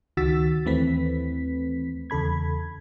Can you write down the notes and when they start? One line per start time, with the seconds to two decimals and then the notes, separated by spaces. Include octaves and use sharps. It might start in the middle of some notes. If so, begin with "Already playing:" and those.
0.17 C#2 D#3 F#4 E6 A6 B6
0.65 D#2 E3 A3 C4 B4 B6
2.10 E2 C#3 A4 B5 G#6